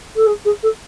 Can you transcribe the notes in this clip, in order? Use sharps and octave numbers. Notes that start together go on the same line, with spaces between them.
A4
G#4
G#4
A4